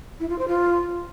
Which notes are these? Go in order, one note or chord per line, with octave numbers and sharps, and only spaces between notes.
E4
F4
C5
F4